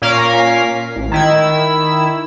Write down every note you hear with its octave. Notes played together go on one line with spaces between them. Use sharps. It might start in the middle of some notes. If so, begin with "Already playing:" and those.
A#2 A#3 C#4 A#4 F5 B6
A1
D#3 E4 E6